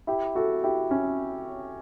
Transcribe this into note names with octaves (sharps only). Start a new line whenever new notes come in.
E4 G4
F#4 A4
E4 G4
C#4 E4